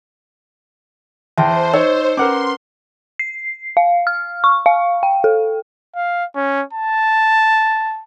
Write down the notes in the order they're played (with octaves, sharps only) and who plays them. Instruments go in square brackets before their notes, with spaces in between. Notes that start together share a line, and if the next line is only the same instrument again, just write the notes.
[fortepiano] E2 G5 [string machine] C5 [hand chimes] E5 A5 C6
[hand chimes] D#4 D#5 E6 [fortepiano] C#5
[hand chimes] C#4 B4 [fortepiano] A#4 F#5 D6 [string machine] C6
[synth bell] C7
F5
F6
C#6
F5
G5
A4
[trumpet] F5
C#4
A5